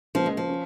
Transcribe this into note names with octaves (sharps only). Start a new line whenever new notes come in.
C#2 C#3 F3 A#3
G#3
F3
C#4